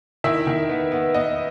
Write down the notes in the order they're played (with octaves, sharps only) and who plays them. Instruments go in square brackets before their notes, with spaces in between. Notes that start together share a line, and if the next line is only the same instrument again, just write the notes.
[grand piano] D#3 E4 E5
D#3
B3
B3
B3 D#5